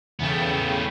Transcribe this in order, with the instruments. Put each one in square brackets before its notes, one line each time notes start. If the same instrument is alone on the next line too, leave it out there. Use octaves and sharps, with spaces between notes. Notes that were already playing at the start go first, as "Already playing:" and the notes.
[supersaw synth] E2 C#3 G5 [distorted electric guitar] A3 B3